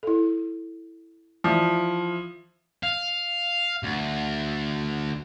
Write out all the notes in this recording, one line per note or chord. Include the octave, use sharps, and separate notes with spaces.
E4 A4
E3 F3 E4
F5
D2